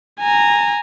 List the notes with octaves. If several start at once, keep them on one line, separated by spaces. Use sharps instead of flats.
G#5 A#5